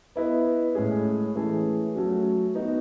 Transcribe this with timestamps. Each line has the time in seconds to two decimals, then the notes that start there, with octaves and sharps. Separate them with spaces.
0.16 B3 E4 B4 D#5
0.75 A2 G#3 C#4 G#4
1.35 E3 A3 C#4 G#4
1.95 F#3 A3 C#4 F#4
2.55 B3 D#4 F#4